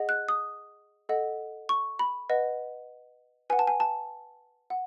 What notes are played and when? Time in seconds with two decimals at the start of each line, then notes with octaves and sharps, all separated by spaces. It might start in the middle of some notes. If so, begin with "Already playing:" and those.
Already playing: G#4 D#5 F#5
0.09 F#6
0.29 D#6
1.09 A4 D#5 F#5
1.69 C#6
1.99 B5
2.30 B4 D#5 F#5
3.50 B4 F#5 G#5
3.59 A5
3.67 G#5
3.80 A5
4.70 F#5